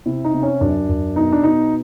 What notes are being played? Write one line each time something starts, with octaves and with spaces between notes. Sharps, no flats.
C3 E4
D#4
C3
C#4
F#2 D4
F#2
B2 D#4
D4
B2 D#4